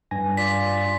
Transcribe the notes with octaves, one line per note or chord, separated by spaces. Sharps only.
G2 G#5 A#6
F4 D5 B6